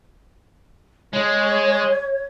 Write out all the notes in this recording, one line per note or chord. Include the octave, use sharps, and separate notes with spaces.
G#3 C#5